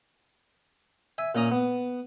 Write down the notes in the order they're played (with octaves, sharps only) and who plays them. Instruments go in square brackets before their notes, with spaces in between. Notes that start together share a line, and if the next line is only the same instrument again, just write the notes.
[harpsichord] E5 G#5
A#2 C#4 A#5 D#6
B3